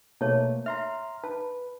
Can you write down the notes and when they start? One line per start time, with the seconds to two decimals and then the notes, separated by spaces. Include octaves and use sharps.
0.21 B2 A3 A#3 C#5 A5
0.66 E5 A#5 C6 F6
1.24 B4 A5